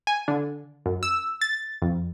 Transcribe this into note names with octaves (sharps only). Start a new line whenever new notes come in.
G#5
D3
F#2
E6
A6
F2